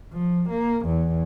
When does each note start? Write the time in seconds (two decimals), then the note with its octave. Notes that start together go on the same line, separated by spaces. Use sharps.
0.13 F3
0.49 A#3
0.86 E2